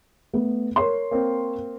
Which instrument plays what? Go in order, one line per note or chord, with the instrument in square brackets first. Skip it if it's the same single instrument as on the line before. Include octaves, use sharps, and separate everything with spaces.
[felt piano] A3 B3
A#4 C#5 C6
[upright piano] A#3 C4